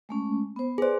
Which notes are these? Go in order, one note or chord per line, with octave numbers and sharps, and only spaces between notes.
G#3 A3 C#4
B3 C5
G#4 B4 C5 D5